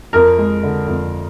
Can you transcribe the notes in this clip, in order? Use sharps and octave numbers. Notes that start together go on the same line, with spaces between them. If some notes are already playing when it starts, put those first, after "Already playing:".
F2 A#4
G#3
D3
F2